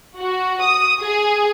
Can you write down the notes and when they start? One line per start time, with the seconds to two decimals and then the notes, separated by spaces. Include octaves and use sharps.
0.18 F#4
0.62 D#6
1.00 G#4